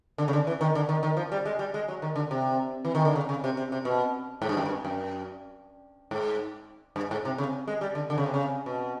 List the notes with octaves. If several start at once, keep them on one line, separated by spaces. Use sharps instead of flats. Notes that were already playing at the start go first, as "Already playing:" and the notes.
D3
C#3
D3
E3
D#3
D3
D#3
D#3
F3
G3
G#3
G3
G#3
F#3
D#3
D3
C3
E3
D#3
D3
C#3
C#3
C3
C3
C3
B2
G#2
G2
F#2
G2
F#2
G#2
G2
G#2
C3
C#3
G#3
G3
D3
D3
C#3
C3
C#3
B2